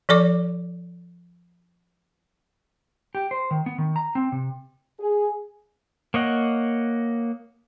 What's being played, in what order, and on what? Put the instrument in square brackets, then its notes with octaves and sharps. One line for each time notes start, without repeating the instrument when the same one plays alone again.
[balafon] F3 A4 D5 D6
[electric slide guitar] G4
C5
D#3
B3
D#3
A#5
C4
C3
[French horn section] G#4
[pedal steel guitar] A#3 C#5 D#5 F#5